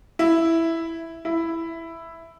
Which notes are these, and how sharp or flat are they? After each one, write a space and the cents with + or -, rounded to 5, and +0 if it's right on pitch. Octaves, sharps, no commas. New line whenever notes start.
E4 +0
E4 +5